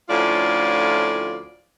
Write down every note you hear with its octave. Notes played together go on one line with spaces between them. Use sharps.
D2 A2 F3 C#4 F4 D5